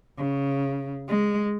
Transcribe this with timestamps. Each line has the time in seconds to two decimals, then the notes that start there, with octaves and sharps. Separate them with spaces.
0.18 C#3
1.08 G#3